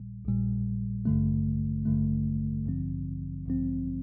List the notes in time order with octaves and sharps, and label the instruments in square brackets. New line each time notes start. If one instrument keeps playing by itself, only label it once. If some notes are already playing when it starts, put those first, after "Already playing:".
Already playing: [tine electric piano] A#1 A#2 G3
A#1 A#2 G3
A1 G2 D3 A3
A1 G2 D3 A3
A1 G2 D3 F3 C4
A1 G2 D3 F3 C4